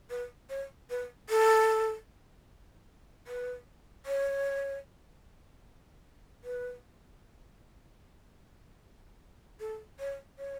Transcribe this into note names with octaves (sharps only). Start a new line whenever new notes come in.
B4
C#5
B4
A4
B4
C#5
B4
A4
C#5
C#5